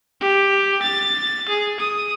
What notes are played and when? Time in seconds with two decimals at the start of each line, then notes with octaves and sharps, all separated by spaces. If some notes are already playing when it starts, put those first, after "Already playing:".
0.21 G4
0.82 A6
1.49 G#4
1.80 D#6